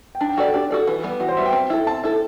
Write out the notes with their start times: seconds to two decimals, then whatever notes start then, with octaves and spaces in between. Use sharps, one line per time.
0.15 G5
0.21 D4 A5
0.29 G5
0.37 F#4 A4 D5 F#5
0.54 D4 G4
0.71 F#4 A4 D5
0.87 E3
1.04 G3 B3
1.20 E3 F#4
1.29 C5
1.37 G3 B3 E5
1.46 G5
1.53 C4
1.70 E4 A4
1.87 C4 A5
2.04 E4 A4